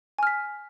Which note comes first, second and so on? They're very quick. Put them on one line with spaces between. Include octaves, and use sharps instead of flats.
G#5 F6 B6